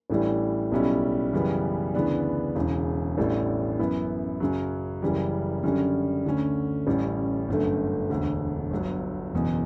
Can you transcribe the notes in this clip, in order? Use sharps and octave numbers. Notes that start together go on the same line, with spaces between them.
A1 A2 E3 G3 D4
B1 B2 G3 C#4 E4
F#2 C#3 E3 G3 B3
D2 C#3 E3 B3 D4
E1 E2 C#3 E3
A1 A2 G3 D4
F#2 E3 B3 E4
F#2 C#3 F#3
F#1 F#2 C#3 E3 G3
F#2 D3 G3 C#4
D2 D3 A3 C#4
A1 A2 G3 C#4
G1 F#2 D3 A3
E1 D2 D3
G1 G2 F#3
F#1 E2 B2